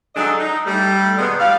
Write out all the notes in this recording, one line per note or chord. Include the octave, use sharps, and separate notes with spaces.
F#3 G#3 D4 D#4 A4 D#5
D#4
G3 A3
B2 D#3 G#3 B3
G3 F5